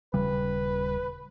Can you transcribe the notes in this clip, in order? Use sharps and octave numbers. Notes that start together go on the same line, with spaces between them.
D#1 C#3 G3 B4